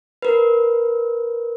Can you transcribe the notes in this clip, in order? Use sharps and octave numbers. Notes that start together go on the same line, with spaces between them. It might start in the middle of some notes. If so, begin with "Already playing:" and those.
A#4 B4